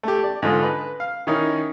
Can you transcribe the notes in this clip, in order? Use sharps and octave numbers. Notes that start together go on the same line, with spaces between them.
A3 G4
D5
G#2 D3 F4 D#5
B4
F5
D#3 C#4 D#4 E4